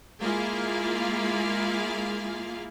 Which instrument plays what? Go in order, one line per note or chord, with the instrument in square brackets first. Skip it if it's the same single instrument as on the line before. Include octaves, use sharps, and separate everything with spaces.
[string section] G#3 A#3 E4 F4 G#4 F5